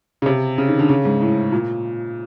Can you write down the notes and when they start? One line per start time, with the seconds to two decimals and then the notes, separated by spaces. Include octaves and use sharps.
0.22 C#3
0.26 C3
0.58 C#3
0.68 D#3
0.79 D3
0.89 C#3
1.05 G#2
1.21 A2
1.52 A#2